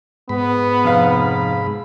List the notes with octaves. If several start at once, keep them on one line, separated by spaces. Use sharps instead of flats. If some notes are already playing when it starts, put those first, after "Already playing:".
G#2 B3 B5
F1 F5